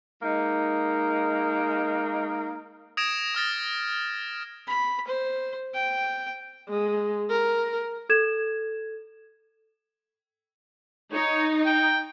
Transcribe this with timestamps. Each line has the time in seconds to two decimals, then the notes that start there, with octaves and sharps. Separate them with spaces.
0.22 G#3 A#3 D#4
2.97 D#6 G#6 A#6 D7 E7
3.35 D#6 F6 A6 A#6
4.67 B5
5.07 C5
5.74 G5
6.68 G#3
7.30 A#4
8.09 A4 G#6 E7
11.13 D#4 C#5
11.66 G5